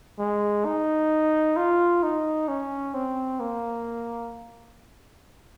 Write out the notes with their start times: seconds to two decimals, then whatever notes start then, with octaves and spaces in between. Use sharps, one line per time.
0.19 G#3
0.65 D#4
1.57 F4
2.03 D#4
2.48 C#4
2.94 C4
3.40 A#3